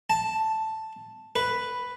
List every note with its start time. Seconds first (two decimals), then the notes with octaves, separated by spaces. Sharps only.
0.10 A5
1.36 B4